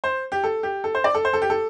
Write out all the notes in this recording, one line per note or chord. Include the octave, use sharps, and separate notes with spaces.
C5
G4
A4
G4
A4
C5
D5
A4
C5
A4
G4
A4